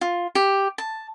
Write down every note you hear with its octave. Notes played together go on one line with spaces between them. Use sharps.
F4
G4
A5